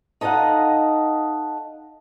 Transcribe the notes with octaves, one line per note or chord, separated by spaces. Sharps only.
D#4 A4 D#5 F5 F#5